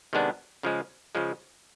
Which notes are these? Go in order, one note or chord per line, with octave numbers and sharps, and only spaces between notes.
C3 D#3 G#3 B3 D4
C#3 F3 G#3
C#3 F3 G#3